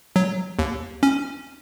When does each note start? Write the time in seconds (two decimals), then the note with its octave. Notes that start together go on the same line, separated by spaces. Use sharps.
0.16 F#3
0.59 D#2
1.03 C#4